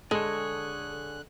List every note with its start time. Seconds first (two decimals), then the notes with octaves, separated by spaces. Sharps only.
0.11 D3 G#3 G#4 A4 C#5 F#6